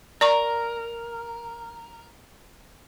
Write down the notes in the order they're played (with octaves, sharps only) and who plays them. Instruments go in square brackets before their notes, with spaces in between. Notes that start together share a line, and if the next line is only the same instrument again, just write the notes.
[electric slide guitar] A#4 [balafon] D5 A#5 C#6